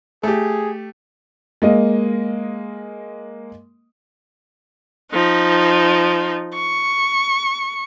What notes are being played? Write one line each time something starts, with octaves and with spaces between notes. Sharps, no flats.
A3 G4 G#4
G#3 A#3 D#5
F3 D#4
C#6